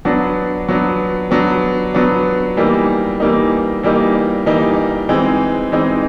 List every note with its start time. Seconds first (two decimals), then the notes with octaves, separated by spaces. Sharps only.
0.05 F#3 B3 D4
0.68 F#3 B3 D4
1.31 F#3 B3 D4
1.94 F#3 B3 D4
2.57 E3 G3 A#3 D#4
3.20 E3 G3 A#3 D#4
3.83 E3 G3 A#3 D#4
4.46 E3 G3 A#3 D#4
5.09 E3 G#3 C4 D#4
5.72 E3 G#3 C4 D#4